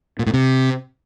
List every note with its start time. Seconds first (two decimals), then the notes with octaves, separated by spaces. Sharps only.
0.19 A#2
0.26 A2
0.34 C3